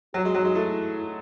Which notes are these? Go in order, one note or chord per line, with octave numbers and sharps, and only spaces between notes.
F#3 F#4
G#3
F#3
G#3
A3 E4